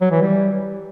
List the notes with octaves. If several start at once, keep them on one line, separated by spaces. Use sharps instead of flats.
F#3
E3
G3